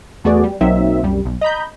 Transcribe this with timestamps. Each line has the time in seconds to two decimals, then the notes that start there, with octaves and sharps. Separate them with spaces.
0.24 E2 A3 B3 F#4 G#4 D5
0.44 G3
0.61 B1 F#3 A#3 C4 D#4 E5
1.03 C2 F#2 G3
1.25 B1
1.41 D#5 A#5 B5 G6